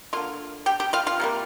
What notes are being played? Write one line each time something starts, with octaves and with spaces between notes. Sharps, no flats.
D3 A#3 F4 F5
G4 G5
G4 G5
F4 F5
F4 F5
C3 G3 A#3